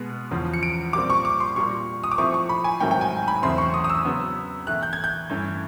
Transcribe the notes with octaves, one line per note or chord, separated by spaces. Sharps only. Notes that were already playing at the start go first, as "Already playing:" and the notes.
Already playing: B2 G#3 B3
E2 C#3 F3
C#7
D7
A#2 G3 C4 D6
C#6
D6
C6
A#2 G3 A#3 C#6
D#6
D6
A2 F3 A3 C4 C#6
C#6
B5
G#5
G#2 D#3 F#3 A3 C4 G5
G5
G#5
B5
E2 C#3 F#3 A3 C4 C6
C#6
D#6
D#6
E6
C#3 F#3 B3
A2 E3 A3 F#6
G6
G#6
G6
G2 E3 A3 C#4